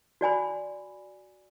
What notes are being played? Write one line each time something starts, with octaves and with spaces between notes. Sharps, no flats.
F#4 D5 G#5 B5